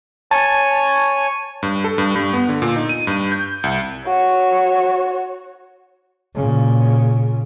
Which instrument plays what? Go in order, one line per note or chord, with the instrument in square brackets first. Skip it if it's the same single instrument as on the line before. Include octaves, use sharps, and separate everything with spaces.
[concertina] C#5 G#5 [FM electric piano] A5
[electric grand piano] G2
A4
G2
G2
B3
D3
A#2
D#4
D#7
G2
G6
C2
[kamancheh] F#4 C#5
[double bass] A#2 C#3